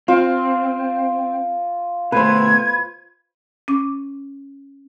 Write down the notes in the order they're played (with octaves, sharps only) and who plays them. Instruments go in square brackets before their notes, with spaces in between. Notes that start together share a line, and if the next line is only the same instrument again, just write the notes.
[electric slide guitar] C4 [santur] F4
[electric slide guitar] B2 A3 [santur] B4 C5 [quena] G#6
[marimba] C#4 D6